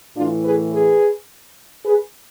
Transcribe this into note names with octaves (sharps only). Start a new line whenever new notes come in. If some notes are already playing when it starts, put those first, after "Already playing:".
A2 E3 D4 F4
G#4 B4
G#4 B4
G#4 B4